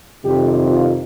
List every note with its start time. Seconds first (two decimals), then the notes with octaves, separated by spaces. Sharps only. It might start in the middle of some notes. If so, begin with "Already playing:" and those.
0.23 F2 C3 D#3 G3 G4
0.70 F4